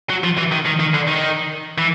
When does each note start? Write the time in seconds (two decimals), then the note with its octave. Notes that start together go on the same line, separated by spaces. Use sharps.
0.10 F#3
0.24 F3
0.38 E3
0.52 D#3
0.66 D#3
0.80 D#3
0.94 D3
1.08 D#3
1.78 E3